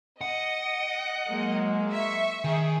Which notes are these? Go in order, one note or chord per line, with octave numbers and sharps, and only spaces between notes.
D#5 F#5
F#3 G#3 A#3
E5 C#6
D#3 G#4